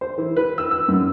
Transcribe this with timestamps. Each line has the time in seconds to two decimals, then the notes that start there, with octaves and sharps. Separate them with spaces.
0.01 C5
0.18 E3
0.37 B4
0.58 E6
0.71 E6
0.88 F#2